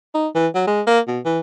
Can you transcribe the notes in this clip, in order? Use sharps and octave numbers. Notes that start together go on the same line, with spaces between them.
D#4
E3
F#3
G#3
A#3
B2
E3